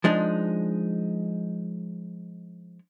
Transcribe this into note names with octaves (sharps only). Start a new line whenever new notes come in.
F3 G#3 D4 D#4